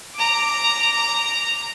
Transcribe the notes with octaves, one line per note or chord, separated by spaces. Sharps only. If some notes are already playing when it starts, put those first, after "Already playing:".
A#5 D6